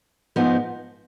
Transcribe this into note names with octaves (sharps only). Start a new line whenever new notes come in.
G#2 F3 B3 D#4